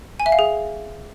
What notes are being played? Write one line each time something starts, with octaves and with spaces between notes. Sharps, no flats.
G#5
E5
F5
G#4